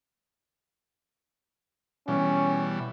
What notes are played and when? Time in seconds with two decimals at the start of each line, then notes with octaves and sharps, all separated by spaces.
2.08 B2 E3 G3 C#4